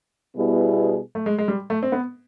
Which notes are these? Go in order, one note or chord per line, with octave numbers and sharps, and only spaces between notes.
B2 G3 B3 E4 G#4
A3
G#3
G#3
G3
A3
C4
B3